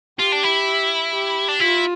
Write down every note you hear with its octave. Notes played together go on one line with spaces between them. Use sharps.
F4 G4
D4
E4
G4
D4
E4 F4